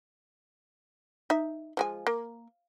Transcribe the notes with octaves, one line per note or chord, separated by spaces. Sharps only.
D#4 E5
F3 G#3 G#5
A#3